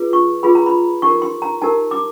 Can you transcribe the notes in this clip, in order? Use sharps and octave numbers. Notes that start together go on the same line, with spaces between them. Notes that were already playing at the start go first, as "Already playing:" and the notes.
Already playing: F4 G#4 B4
C#6
F4 G#4 B4 B5
A#5
B5
D#4 G4 A#4 C#6
C6
A#5
D#4 G4 A#4 A5
D6